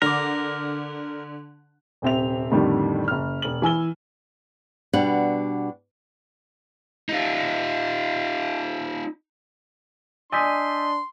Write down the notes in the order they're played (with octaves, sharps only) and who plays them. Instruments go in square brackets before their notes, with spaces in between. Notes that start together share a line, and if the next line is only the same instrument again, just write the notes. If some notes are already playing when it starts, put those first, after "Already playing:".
[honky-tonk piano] D3 D6 [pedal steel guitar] A#4
[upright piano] D#1 C3 C4 E5 F7
F2 A2 D3 D#3 G3
F#1 F6
E1 F#7
E3 G#5 E6 G7
[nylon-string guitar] B2 G3 D4 F#5
[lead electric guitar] D#4 F4
[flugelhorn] D4 [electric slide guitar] D5 D#5 G#5 [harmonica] C6 [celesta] E6 G6 B6